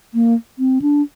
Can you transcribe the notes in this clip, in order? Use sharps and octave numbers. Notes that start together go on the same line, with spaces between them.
A#3
C4
D4